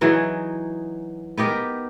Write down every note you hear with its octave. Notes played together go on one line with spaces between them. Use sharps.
E3 F#3 D#4 G#4
B3 D#4 G4 A#4